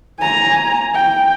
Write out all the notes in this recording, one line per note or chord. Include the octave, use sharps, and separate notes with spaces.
G#5 A#5
G5